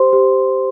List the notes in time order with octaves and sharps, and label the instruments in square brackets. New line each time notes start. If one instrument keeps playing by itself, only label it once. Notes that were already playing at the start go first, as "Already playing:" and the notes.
Already playing: [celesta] G4 C5 C6
G4